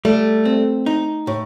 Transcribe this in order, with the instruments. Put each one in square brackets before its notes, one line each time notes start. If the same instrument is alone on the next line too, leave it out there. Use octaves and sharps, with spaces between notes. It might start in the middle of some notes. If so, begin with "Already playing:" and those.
[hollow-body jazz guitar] G3 [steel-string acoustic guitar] A3
[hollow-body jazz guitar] C4
D#4
A2